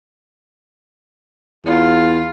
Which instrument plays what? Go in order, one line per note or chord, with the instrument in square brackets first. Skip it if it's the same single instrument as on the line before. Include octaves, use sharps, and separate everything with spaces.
[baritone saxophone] E2 [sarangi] F4